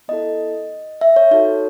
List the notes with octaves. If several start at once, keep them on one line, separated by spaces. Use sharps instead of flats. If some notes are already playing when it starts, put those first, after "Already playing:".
B3 E4 A4 D#5
E5
C#5
D#4 F#4 A4 C#5